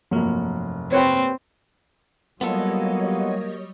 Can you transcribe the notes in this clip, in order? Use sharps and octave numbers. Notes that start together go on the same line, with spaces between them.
F1 G2 F3 F#3 A#3
C4 G4 B4 C#5
F#3 G3 A#3 B3 F4 A4 C#5 D#5